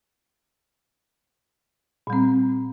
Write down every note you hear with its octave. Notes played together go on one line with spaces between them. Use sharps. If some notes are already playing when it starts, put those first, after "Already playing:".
A#2 G3 C4